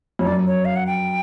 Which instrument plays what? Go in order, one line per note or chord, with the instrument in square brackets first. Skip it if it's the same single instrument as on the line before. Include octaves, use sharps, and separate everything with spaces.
[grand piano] F2 [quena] C#5
[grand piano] F#2 [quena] D5
[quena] C#5
F5
F#5
G5